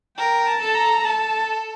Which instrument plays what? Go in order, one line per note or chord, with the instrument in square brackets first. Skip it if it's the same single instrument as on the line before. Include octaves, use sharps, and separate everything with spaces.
[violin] A#4 [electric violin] G5
[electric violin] A5
[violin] A4
[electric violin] A#5
[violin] A4 [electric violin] A5